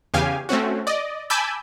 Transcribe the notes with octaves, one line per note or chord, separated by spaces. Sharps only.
E2 C#3 G4 F5 G#5
A3 C4 C#4 F#4
D5 D#5
G#5 A5 B5 D6 E6 G6